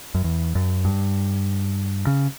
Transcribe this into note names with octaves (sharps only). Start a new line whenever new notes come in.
F#2
E2
F#2
G2
C#3